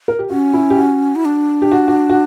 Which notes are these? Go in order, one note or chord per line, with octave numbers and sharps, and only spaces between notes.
A#4
G4
C#4 F#4
E4
G4
F#4
E4
D4
G4
F#4
F#4
F#4